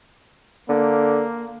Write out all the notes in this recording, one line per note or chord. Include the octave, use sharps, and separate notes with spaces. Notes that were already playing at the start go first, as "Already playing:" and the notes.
D3 A#3